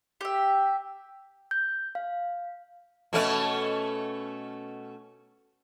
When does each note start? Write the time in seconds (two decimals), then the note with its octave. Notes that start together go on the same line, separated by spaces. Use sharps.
0.21 G4 E5
1.51 G6
1.95 F5
3.13 B2 A3 C#4